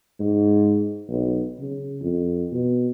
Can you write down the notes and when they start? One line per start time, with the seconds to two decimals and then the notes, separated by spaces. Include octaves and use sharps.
0.20 G#2
1.08 B1
1.59 C#3
2.02 F2
2.52 B2